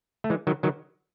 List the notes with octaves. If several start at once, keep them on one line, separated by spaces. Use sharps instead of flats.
A3
E3 G#3
D#3 F#3
D#3 F#3